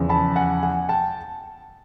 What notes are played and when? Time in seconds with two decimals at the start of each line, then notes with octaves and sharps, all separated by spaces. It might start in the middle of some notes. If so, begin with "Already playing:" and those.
Already playing: E2 C#3 F3
0.09 A5 B5
0.36 F#5 G#5
0.63 F#5 G#5
0.89 G5 A5